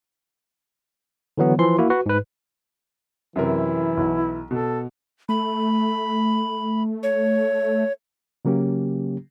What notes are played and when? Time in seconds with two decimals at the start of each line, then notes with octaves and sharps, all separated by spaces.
1.38 D3 E3 F#3 B3
1.58 E3 F3 C6
1.78 A#3 E4 F#4
1.90 F#4 B4
2.06 G#2 B4
3.36 F#2 C3 E3 E4 A#4
3.97 B1
4.51 B2 A4
5.29 A3 B5
7.03 C#5
8.45 C#3 F#3 A#3 C#4 G4